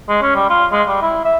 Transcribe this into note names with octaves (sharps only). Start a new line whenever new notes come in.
G#3
C#4
G3
F4
G#3
G3
E4
E5